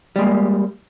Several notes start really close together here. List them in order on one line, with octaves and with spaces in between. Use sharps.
G3 G#3 A#3